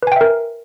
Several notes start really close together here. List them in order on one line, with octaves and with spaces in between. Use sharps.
B4 G#5 G5 E5 A#4